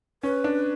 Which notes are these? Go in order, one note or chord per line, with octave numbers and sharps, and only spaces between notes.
C#4 B4
D4